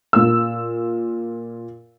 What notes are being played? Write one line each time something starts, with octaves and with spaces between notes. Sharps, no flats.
A#2 E6